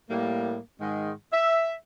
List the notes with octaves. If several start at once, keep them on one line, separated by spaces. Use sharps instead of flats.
A2 G3 A#3
G#2 D#3 G#3
E5